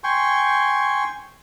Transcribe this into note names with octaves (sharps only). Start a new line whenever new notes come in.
G5 G#5 C6 C#6